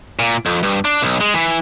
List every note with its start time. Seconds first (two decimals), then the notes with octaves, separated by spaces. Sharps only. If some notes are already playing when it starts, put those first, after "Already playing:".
0.19 A#2
0.46 F2
0.63 G2
0.85 D4
1.02 B1
1.21 G#3
1.34 E3